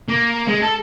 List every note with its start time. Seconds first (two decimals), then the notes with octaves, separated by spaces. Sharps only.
0.08 A#3
0.48 G#3
0.62 A4